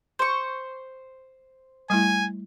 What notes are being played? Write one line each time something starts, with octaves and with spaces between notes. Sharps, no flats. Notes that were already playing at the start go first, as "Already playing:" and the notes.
C5 C#6
G3 A3 E4 G#5